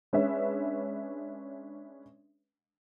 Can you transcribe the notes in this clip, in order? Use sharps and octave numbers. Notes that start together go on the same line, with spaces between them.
G#3 C#4 D4 B4 E5